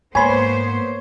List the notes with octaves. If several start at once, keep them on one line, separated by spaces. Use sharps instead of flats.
G#2 A#3 B3 C5 C#5 G#5 B5 C6